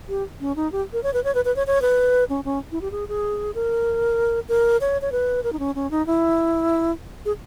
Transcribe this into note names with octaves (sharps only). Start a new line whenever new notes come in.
G4
C#4
D#4
G4
A#4
C#5
B4
C#5
B4
B4
C#5
C#5
B4
C#4
C#4
E4
G4
G#4
G#4
A#4
A#4
C#5
C#5
B4
A#4
D#4
C#4
C#4
D#4
E4
G#4